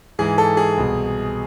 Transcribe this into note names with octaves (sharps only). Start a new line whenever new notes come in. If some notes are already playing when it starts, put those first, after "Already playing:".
G#2 E3 G#4
A4
G#4
C2 B2